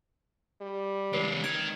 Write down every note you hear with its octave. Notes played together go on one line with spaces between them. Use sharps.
G3
C#2 E3 B4 C#5
D#3 G#6 D7